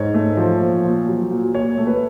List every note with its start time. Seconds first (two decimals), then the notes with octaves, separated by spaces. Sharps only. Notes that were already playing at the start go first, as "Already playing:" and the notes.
Already playing: G#2 C#5
0.14 A3
0.37 F3
0.61 A#2
0.85 A#2
1.08 F#3
1.31 A#2
1.54 A#2 C#5
1.78 A3
1.87 B4